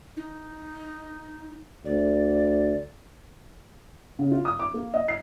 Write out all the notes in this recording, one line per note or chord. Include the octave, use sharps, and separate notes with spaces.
D#4
D2 D5
C#3
F4
D#6
D6
A#3
D#5
C7